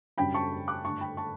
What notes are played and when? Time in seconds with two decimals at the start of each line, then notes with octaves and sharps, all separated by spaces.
0.17 F#2 C#3 G3 D4 G5 B5
0.34 A5 C#6
0.68 D6 F#6
0.84 G2 D3 A3 A5 C#6
1.01 G5 B5
1.17 A5 C#6